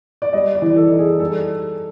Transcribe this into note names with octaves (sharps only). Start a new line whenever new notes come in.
D5
G3 D#5
D5
E3
A4
D#4
G#4
G3 A4